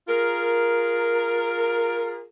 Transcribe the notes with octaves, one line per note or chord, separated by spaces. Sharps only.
F4 G#4 A#4